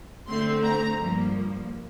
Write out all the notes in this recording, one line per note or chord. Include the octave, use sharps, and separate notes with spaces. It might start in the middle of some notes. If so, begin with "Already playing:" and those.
D3 A3 C4 C6
A#5
G2 F3 A#3